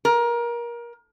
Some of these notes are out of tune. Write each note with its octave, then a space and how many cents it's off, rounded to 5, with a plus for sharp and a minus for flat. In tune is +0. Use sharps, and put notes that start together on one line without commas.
A#4 +25